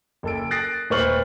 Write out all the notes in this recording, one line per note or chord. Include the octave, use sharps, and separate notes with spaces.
F#1 A4 D7
D#6 F#6 A6 A#6 C7 D7
D#1 B4 C5 C#6 F6 F#7